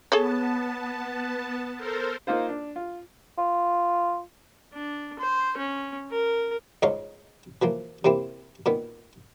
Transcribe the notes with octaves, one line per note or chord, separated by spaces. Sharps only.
B3 G#4 A4 C#5 A5
A4 A#4 C5
A#3 D#4 F4 C5
D4
F4
F4
D4
C5
C#4
A#4
C#2 G#2 D#4 C#5 D#5 F5
E3 F3 A#3
C3 A#3 C4 E4
A#2 D#3 B3